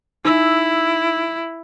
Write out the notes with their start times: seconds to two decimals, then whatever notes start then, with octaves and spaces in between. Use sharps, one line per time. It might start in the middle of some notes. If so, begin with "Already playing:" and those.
0.25 D#4 E4 E6